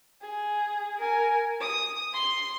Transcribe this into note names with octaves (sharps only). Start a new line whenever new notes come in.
G#4
A#4 G#5
D#6
C6